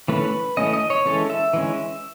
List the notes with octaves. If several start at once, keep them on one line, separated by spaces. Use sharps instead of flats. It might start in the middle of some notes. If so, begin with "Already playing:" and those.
E3 A3 C#4 B4
E3 A3 C#4 D#5
D#5
C#5
E3 G#3 C#4 A4
E5
E3 G#3 C#4